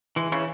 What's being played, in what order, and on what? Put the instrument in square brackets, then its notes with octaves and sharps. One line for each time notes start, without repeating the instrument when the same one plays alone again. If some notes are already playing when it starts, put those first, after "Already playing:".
[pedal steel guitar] E3 [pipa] G#3
[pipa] C#3 [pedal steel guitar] E3